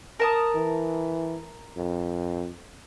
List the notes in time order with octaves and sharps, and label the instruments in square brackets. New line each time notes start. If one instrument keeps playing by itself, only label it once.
[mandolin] A#4 A5 D#6
[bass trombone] E3
F2